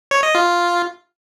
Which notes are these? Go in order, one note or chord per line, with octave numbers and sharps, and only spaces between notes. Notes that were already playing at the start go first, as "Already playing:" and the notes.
C#5
D#5
F4